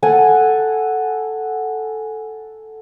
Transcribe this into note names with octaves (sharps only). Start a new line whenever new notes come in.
A4 F#5 G#5